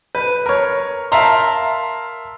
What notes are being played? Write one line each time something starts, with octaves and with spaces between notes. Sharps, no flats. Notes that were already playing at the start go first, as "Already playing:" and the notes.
B4
A#4 C#5
A#4 E5 F5 A5 A#5 C6